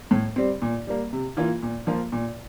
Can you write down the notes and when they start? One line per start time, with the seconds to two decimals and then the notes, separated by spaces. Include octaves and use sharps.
0.11 A2
0.36 G3 C4
0.62 A#2
0.87 G3 A#3
1.13 C3
1.37 E3 A#3 F4
1.63 A#2
1.87 F3 A#3 F4
2.12 A#2